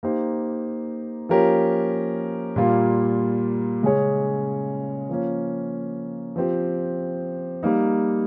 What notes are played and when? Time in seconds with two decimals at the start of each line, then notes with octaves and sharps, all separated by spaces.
0.03 A#3 D#4 G4 C5
1.29 F3 A#3 C#4 G4 A#4
2.56 A#2 G3 A#3 F4
3.83 C#3 G#3 C#4 G#4 C#5
5.09 F3 A#3 C#4
6.36 F3 C4 G4
7.63 G3 A#3 D#4